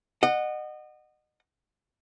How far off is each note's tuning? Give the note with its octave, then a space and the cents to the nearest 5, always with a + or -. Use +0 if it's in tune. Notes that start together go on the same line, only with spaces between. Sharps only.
D#5 -30 F#5 +0